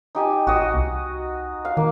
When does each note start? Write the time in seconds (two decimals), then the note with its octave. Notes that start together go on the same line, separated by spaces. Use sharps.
0.15 D#4 G4 G#5
0.47 A1 F#4 D#5
0.74 C2
1.65 F5
1.77 D#3 A#3